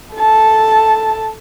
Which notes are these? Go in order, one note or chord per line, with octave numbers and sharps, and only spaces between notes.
A4 A5